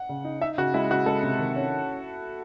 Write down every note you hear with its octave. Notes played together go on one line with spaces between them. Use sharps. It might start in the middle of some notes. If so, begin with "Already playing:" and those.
Already playing: F#5
C#3
D#4
D#4 E5
C#3 F#4
G#3 E4
C#3 F#4
G#3 A4
C3
D#3
C#4